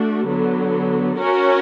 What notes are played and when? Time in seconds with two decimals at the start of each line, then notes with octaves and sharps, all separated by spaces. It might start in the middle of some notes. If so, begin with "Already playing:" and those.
Already playing: A3 D4 F#4
0.26 D3 F#3 B3
1.18 C#4 F#4 A#4 C#5